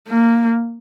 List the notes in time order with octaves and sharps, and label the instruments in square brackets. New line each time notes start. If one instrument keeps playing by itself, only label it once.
[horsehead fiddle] A#3